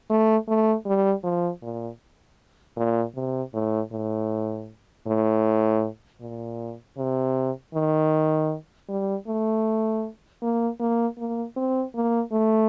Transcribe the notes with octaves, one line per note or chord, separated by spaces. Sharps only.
A3
A3
G3
F3
A#2
A#2
C3
A2
A2
A2
A#2
C3
D#3
G3
A3
A#3
A#3
A#3
C4
A#3
A3